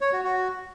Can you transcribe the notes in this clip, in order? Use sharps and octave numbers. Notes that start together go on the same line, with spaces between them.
C#5
F#4
F#4